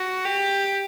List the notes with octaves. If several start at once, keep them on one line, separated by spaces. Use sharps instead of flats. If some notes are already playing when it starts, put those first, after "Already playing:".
Already playing: F#4
G4